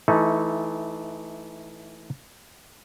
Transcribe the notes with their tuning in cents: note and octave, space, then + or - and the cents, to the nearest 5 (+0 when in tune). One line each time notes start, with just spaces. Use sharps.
E3 +0 A3 -10 D#4 +20